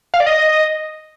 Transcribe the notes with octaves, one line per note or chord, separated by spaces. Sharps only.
F5
D5
D#5